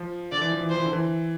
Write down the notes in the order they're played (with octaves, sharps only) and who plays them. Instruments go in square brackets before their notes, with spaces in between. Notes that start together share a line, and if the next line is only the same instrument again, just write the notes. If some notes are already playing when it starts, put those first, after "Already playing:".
Already playing: [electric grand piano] F3
[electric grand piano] D3 [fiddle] D5
[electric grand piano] E3
F3
E3
[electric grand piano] F3 [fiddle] C5
[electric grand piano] E3
D3
E3